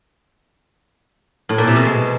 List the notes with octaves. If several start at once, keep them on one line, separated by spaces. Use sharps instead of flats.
A2
A#2
C3
B2
G#3